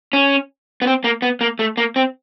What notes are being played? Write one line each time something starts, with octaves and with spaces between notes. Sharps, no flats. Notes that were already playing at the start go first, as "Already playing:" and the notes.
C#4
B3
C4
A#3
B3
A#3
A3
A#3
C4